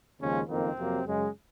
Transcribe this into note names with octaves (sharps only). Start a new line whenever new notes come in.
D#2 C#3 F3 G#3 C#4
F#1 F2 D#3 A#3 C4
F2 C3 F#3 A#3
F#2 C#3 G#3